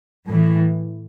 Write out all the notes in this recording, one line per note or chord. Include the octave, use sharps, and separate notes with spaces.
A2 E3